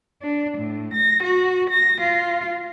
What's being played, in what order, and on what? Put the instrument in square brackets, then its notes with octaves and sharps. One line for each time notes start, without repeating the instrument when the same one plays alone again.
[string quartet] D4
A2
A#6
F#4
A#6
F4